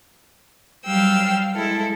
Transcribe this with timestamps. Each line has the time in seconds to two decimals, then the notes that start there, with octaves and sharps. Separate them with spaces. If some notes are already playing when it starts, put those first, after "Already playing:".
0.86 F#3 G3 F5 G5 E6
1.55 G#3 E4 A4